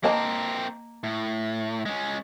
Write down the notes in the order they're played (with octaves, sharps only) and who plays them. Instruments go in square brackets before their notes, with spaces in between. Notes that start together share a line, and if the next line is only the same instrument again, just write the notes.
[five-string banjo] A#3 D#5 A5 [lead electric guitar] C4 A#4
[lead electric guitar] A2
G#3 C#4